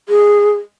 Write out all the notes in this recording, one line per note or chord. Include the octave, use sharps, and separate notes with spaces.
G#4